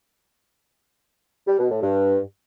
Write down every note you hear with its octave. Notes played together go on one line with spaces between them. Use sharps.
G3
B2
A2
G2